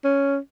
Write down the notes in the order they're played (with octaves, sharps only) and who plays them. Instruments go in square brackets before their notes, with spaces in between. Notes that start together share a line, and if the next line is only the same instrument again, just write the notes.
[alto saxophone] C#4